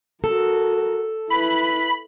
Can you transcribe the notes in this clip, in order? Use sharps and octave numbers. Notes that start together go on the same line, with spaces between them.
F#4 A4 A#4
E4 B4 B5